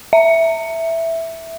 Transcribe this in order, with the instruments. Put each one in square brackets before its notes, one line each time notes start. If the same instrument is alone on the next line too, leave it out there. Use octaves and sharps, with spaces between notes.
[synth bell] E5